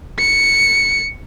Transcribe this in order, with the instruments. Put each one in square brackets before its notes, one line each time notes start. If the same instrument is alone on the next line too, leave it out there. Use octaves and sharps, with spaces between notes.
[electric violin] C#7